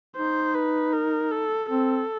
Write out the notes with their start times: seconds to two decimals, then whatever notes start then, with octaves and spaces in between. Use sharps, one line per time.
0.16 D#4 C5
0.54 B4
0.93 A#4
1.31 A4
1.69 C4 A4